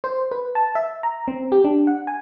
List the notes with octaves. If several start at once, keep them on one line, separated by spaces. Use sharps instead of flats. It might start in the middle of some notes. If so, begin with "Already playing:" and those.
C5
B4
A5
E5
A#5
C4
G4
D4
F#5
G#5